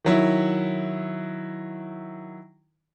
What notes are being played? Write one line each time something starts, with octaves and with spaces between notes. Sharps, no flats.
D#3 F#3 E4